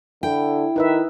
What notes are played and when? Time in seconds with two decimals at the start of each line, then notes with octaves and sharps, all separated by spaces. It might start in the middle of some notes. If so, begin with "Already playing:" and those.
0.23 D3 E4 G5
0.76 D#3 D#4 B4 E5